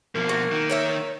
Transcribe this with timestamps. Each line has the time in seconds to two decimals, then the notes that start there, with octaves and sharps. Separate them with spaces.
0.15 B2 F3 A#3
0.29 F#4
0.52 D#3
0.70 A#4 C#5 E5